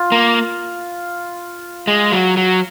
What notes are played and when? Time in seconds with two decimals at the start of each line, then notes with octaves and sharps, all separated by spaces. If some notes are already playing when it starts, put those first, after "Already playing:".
Already playing: F4
0.12 A#3
1.87 G#3
2.12 F#3
2.37 F#3